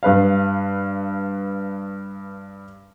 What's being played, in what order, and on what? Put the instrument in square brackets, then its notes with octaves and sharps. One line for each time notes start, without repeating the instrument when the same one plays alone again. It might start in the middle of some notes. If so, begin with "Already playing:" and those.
[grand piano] G2 B4 F5